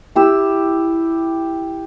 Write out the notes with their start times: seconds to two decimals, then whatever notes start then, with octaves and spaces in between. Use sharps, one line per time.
0.16 E4 G4 E6